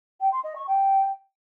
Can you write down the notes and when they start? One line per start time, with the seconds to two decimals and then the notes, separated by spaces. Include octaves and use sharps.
0.20 G5
0.32 C6
0.44 D#5
0.56 C#6
0.67 G5